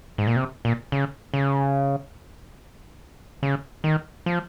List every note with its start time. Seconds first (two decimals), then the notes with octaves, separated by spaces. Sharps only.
0.18 G#2
0.27 A#2
0.36 C3
0.65 A#2
0.92 C#3
1.34 C#3
3.43 C#3
3.84 D#3
4.26 F3